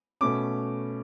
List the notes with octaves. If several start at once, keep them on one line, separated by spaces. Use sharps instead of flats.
B2 A3 C#4 D6